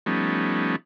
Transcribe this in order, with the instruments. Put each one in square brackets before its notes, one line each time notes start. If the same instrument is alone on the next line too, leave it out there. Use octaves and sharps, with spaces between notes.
[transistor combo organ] F3 G3 A3 B3 C#4 D#4